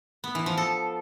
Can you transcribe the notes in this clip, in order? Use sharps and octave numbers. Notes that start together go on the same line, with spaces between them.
B3
E3
F3
A4